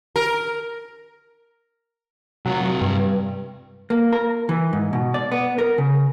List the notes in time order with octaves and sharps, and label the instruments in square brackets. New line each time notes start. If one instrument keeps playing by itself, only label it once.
[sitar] A#4
[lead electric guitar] C3 F4 [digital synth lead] F#3
[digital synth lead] G2
[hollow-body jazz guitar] A#3
A#4
E3
G#2
B2
D5
B3
A#4
C#3